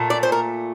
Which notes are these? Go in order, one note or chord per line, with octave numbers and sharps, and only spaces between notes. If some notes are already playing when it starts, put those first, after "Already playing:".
Already playing: A#2 A3
D5
C5
A#4